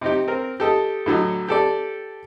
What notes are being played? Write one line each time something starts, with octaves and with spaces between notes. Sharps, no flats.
C3 D#4 G4
C4 A#4
G4 A4 D#5
A2 D3 F#3 D#5
G4 A4 D5